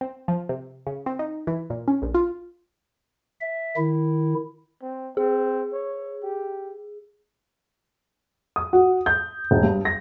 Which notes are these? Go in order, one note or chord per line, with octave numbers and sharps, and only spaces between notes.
C4
F3
C3
C#3
C4
D#4
E3
A#2
C#4
A#1
F4
E5
D#3 E4
C4
C4 G#4
C#5
G4
D#6
F#4
G6
E1
G2
A#6